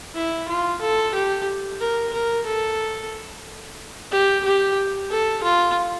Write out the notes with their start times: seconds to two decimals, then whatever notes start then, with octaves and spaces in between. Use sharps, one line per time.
0.15 E4
0.48 F4
0.81 A4
1.14 G4
1.80 A#4
2.13 A#4
2.46 A4
4.11 G4
4.44 G4
5.10 A4
5.43 F4